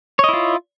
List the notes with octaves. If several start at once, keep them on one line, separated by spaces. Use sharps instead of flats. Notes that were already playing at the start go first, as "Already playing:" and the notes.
E4 F4 C#5 D#5